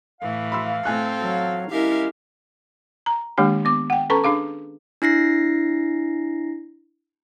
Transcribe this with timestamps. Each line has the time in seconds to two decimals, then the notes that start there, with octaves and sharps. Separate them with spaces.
0.21 A2 E3 F5
0.52 B5 C6 E6
0.85 A2 C4 A4 G#5 F#6
1.22 F#3
1.71 G#3 C#4 E4 G4 A#4 E5 F5
3.06 A#5
3.38 D#3 G#3 A#3 D4 G4
3.65 B3 D6
3.90 F#5 G5
4.10 C#4 A4 B4 A5 A#5 C#6
4.24 D4 G#4 F5 D6
5.02 D4 E4 A#6 C7